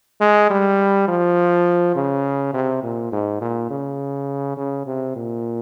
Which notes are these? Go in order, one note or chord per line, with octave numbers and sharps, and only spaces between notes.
G#3
G3
F3
C#3
C3
A#2
G#2
A#2
C#3
C#3
C3
A#2